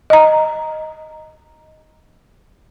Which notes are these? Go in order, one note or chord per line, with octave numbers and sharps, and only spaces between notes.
D#5 A#5